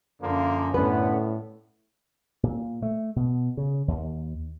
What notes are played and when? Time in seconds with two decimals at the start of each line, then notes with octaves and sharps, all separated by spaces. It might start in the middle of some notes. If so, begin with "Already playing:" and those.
0.21 F#2 D3 F3 A#3
0.74 A2 D3 B3 C#4 B4
2.43 A#2
2.82 A3
3.16 B2
3.57 C#3
3.88 D#2